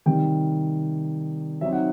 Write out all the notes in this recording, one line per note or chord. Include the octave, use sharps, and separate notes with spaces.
C3 D#3 G3 G5
F#3 C4 D#4 E5
F#5